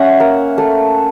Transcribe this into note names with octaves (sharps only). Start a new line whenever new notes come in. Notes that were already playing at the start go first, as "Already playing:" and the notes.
Already playing: C#4 E5 F#5
A#3
A3